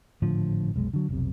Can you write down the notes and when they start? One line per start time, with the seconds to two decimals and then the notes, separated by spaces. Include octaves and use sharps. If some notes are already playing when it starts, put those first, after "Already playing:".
0.22 G#1 A2 D3 F3
0.74 F1 B1 G#3
0.94 D3 F#3
1.09 F1 B1 C3